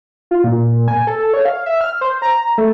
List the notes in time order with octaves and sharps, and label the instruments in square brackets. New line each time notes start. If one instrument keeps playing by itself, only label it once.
[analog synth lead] F4
A#2
G#5
A4
C#5
F5
E5
F6
C5
A#5
A3